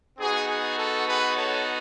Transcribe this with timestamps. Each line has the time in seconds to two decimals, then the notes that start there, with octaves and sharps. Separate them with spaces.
0.19 B3 D#4 F#4 G#4
0.48 G#4
0.78 A4
1.07 G#4 B4
1.37 A4 C#5